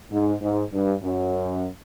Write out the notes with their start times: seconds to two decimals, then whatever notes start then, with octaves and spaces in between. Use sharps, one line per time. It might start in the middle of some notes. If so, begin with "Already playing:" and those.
0.12 G#2
0.41 G#2
0.72 G2
1.03 F#2